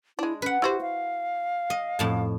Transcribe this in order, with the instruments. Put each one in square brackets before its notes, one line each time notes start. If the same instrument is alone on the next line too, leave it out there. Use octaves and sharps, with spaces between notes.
[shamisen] G#3 D4 [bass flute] E4
[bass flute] C#4 [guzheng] B4 F#5
[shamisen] E4 F#4 C5 [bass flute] G4
[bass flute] F5
[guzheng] D#5
F2 A2 A5